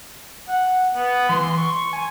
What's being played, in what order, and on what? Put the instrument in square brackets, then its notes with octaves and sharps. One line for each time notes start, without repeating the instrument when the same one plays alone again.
[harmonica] F#5
B3
[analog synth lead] E3 [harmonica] C6
[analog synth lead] C#6
G#5